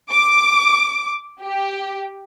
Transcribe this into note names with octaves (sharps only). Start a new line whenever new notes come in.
D6
G4